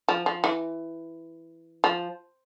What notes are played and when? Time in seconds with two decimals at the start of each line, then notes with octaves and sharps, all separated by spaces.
0.08 F3
0.26 F3
0.44 E3
1.84 F3